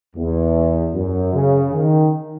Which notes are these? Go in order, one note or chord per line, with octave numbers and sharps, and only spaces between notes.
E2
F#2
C#3
D#3